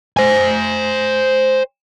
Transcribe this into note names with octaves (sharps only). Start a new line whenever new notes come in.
C5 G#5